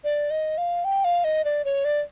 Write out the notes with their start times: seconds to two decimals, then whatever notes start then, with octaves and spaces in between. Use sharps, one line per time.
0.04 D5
0.30 D#5
0.58 F5
0.84 G5
1.04 F5
1.24 D#5
1.45 D5
1.65 C#5
1.85 D5